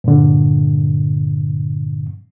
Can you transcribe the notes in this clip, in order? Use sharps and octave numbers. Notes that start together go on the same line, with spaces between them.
G2 A#2 D3